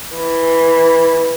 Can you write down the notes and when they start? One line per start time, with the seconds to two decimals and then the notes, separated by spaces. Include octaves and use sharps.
0.16 E3